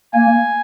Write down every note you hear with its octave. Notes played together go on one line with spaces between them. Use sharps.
A#3 G#5